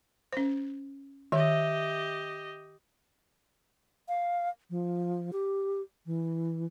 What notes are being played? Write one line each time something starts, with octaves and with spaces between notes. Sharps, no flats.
C#4 C5
D#3 G4 D#5 E5
F5
F3
G4
E3